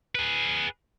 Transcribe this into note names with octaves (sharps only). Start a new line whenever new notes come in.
G#4 B4